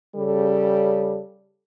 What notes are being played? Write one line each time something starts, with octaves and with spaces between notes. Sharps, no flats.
C#3 G3 A4